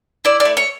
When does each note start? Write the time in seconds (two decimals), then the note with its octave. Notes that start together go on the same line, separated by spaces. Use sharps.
0.25 E4 D5
0.40 D5
0.45 A3
0.57 C#5